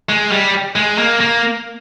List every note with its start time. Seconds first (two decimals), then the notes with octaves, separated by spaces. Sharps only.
0.09 G#3
0.31 G3
0.76 G#3
0.98 A#3
1.20 A#3